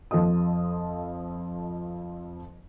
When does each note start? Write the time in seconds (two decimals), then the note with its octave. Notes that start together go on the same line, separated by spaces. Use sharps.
0.11 F2 F3 A4 D#5 D#6